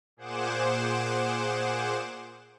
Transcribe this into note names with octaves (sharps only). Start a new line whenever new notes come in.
A#2 G#4 C5 F#5 D6 E7